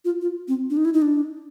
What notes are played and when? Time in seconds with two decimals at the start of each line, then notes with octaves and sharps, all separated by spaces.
0.05 F4
0.21 F4
0.48 C4
0.70 D4
0.77 D#4
0.85 E4
0.93 D#4
1.02 D4